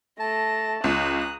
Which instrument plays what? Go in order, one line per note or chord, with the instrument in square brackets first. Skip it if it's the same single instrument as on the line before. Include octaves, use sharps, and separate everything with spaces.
[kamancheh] A3 [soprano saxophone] A5 [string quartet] A#6
[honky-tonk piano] C#2 [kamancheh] A#5 F#6 [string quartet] D#6